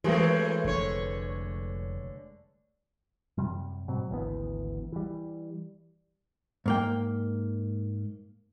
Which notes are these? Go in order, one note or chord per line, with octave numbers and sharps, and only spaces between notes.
E3 F#3 G#3 A3 C4 G4 A#4 B4
F1 D3 C#5
F#2 C3 G3
G#2 B2 F#3 C4
G#1 D2 E3 B3
E3 G3
G#2 A#3 G5